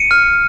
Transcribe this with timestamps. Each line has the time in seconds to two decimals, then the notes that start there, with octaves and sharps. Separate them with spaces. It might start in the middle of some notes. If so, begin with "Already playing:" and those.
Already playing: C#7 D#7
0.11 F6